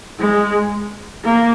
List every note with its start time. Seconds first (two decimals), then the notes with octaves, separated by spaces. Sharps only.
0.19 G#3
1.24 A#3